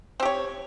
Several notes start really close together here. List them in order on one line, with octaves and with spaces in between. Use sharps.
C4 G4 C#5